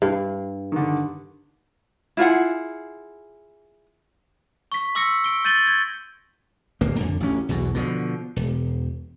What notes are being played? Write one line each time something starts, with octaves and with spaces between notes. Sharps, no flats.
G2
D3 D#3
E4 F4 G#4 F#5
C#6 B6
C6 D6 E6 A#6 B6 C#7
D7 G7
G6 A6 D#7 F#7 G7
G#6
D1 G1 A#3
F2 D3
A1 D2 C#4
B1 E2 B2
B2 D3 D#3 F3
E1